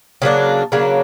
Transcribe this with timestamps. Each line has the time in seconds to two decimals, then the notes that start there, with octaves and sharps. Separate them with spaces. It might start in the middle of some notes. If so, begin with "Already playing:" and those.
0.22 C#3 F#3 A#3 D4
0.72 C#3 F#3 A#3 D4